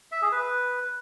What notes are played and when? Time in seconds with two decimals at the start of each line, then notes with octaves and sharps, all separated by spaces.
0.12 E5
0.22 G#4
0.32 B4